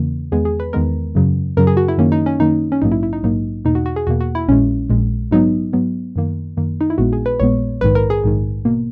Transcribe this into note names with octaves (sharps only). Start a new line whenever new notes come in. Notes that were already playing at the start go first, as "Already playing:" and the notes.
Already playing: E2 C#3 E3 A#3
E2 D#3 G#3 B3 G#4
G#4
B4
E2 D#3 G#3 B3 A#4
F#2 C#3 F#3
F#2 C#3 F#3 A#4
G#4
F#4
E4
F#2 D#3 A#3 C#4
D#4
C#4
F#2 D#3 A#3 D#4
C#4
A#1 G#2 F#3 A#3 D#4
E4
E4
D#4
A#1 G#2 F#3 A#3 D#4
E2 B2 A#3 D#4
F#4
F#4
G#4
E2 B2 A#3 F#4
F#4
E4
A#1 A#2 G#3 C#4
A#1 A#2 G#3
G#2 F#3 B3 D#4
G#2 F#3 B3
F#2 D#3 A#3
F#2 D#3 A#3
D#4
E4
A#1 A#2 G#3 B3 F#4
G#4
B4
A#1 A#2 G#3 B3 C#5
A#1 G#2 D#3 B4
A#4
G#4
A#1 G#2 D#3
B2 A#3